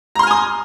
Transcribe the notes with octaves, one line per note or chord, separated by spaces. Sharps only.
G#5 A#5 C6 D#6 F6